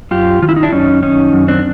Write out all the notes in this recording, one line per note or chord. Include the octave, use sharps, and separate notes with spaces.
F#2 F4 G4
D#3 F4
E4
D#4
D4 E4
F#2 C#4 D#4
D#3 C#4 D#4
F#2
C4 D4